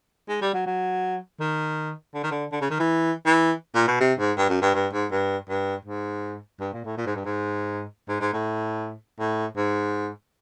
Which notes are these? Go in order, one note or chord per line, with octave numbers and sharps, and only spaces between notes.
G#3
G3
F#3
F#3
D#3
D3
D#3
D3
D3
C#3
D#3
E3
E3
A#2
B2
C3
G#2
G2
F#2
G2
G2
G#2
G2
G2
G#2
G2
A#2
A2
A#2
G#2
G2
G#2
G#2
G#2
A2
A2
G#2